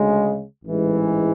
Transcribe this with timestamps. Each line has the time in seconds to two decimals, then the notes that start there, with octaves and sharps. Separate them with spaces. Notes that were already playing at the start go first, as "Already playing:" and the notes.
Already playing: D2 C#3 G#3
0.65 A1 G#2 E3 G#3